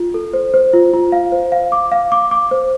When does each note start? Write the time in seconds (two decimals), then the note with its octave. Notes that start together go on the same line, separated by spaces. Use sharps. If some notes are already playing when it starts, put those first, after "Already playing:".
Already playing: F4
0.14 A4
0.33 C5
0.54 C5
0.73 F4
0.94 F4
1.12 F5
1.32 C5
1.52 F5
1.72 D6
1.92 F5
2.12 D6
2.31 D6
2.51 C5